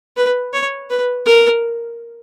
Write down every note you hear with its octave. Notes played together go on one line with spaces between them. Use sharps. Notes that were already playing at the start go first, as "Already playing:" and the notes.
B4
C#5
B4
A#4